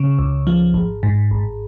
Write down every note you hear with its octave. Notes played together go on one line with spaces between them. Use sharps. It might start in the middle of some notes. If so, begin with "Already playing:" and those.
Already playing: C#3
C#2
F3
G#1
G#2
G#1